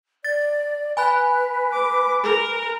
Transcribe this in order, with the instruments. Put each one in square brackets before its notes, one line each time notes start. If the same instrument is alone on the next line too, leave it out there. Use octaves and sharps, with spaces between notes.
[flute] D5 [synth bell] A6
[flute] B4 [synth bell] G#5 B5 F#6
[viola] D6
A#4